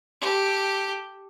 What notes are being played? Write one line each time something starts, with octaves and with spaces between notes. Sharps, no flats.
G4 A4